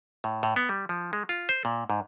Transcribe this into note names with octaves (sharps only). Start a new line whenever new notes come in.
A2
A2
B3
G3
F3
G#3
F4
C5
A#2
G#2